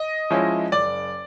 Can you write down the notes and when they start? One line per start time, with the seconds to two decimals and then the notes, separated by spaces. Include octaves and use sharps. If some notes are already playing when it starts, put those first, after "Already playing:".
Already playing: D#5
0.30 F3 G#3 C#4 E4
0.72 F#1 D5 D6